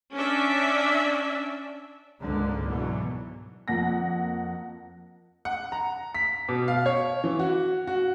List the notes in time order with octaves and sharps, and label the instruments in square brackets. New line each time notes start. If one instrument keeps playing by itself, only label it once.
[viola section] C#4 D4 D5 E5
[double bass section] C#2 G#2 D3 G#3 A#3
G#2 B2 D3 E3 F#3
[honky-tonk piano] F2 A#3 F#5 A#6
[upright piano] F#5
A#5
B6
B2
F5
C#5
E3
F#4
F#4